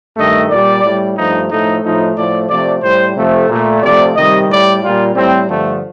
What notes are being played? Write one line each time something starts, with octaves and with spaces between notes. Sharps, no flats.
G2 D#3 A3 D#5
A#2 G3 D5
A2 G3
G2 F3 A3 D#4
A2 F3 A3 D#4
A2 F3 A3 D#4
A2 F3 A3 D5
C3 F3 A3 D5
A2 G3 C5
C3 F3 A3
A#2 A3
C3 F3 A3 D5
C3 D#3 G3 D#5
A2 G3 D5
A#2 G3 F4
A2 G3 C4
G2 D3 F3 A3